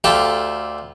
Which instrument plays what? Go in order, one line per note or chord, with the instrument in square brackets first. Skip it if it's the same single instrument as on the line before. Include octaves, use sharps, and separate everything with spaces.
[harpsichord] D2 F4 G4 A4 E5